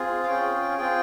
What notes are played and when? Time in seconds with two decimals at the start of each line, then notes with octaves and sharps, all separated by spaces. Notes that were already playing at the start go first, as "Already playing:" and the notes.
Already playing: C4 F4 G#4
0.23 F5
0.28 C#4 F4 G#4 G5
0.78 C4 F4 G#4 G5